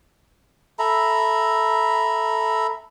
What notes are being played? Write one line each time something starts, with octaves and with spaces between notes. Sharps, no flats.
A4 E5 A#5 B5